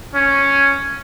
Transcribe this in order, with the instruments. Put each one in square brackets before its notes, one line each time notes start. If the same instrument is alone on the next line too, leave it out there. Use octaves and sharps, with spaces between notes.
[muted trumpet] C#4